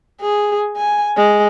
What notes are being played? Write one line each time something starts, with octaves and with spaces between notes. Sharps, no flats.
G#4
G#5
G#3